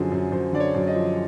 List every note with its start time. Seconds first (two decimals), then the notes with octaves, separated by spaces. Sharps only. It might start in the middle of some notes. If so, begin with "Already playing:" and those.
Already playing: F#2 D3 F3 G#4
0.12 F#2
0.32 F#2 C5
0.53 D3 D5
0.60 C#5
0.74 F#2
0.87 D#5
0.94 F3